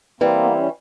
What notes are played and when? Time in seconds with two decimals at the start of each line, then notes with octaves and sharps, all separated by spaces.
0.20 E3 G3 A#3 C4
0.43 B3
0.51 C4
0.59 C#4